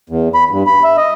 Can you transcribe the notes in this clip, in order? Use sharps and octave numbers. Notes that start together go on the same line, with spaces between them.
E2
B5
G2
B5
E5
D#5